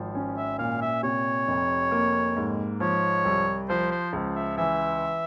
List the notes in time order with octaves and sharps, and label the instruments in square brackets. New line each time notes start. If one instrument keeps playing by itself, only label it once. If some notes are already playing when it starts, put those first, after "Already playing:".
Already playing: [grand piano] G#1 F3
C#4
[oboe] E5
[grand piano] A#2 [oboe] F5
[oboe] E5
[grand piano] C3 [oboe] C#5
[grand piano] F1
A#3
G#2
[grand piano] F3 [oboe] C#5
[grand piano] C2
[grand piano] F3 [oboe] C5
[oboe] C5
[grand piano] C#2
[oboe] E5
[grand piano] E3 [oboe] E5